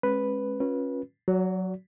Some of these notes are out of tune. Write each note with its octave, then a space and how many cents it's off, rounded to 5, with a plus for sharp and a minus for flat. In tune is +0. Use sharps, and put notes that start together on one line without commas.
G#3 +15 C#4 -35 B4 +0
C#4 -20 F4 +25 B4 -25
F#3 +0 F#4 +0 D5 -45